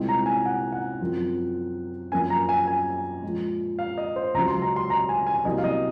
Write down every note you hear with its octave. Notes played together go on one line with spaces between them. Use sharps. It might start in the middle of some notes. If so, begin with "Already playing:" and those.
Already playing: C2 A#2 G#3 C4
A#5
G#5
F#5
F#5
F#2 F3 C4 F4
F#2 F3 A#3 C#4 G#5
A#5
G#5
G#5
A#2 F3 G#3
F5
D#5
C5
C#2 C#3 F#3 A#5
C6
A#5
C6
A#5
G#5
G#5
C2 C3 F#3 A#3 D#5
F5
D#5